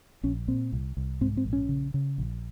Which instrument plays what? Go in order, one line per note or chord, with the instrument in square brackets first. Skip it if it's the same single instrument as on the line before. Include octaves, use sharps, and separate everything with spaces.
[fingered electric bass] A#1 C#4
A#2 C4
C2
C2
G#2 C4
C4
A#1
C#4
C#3
C#3
A#1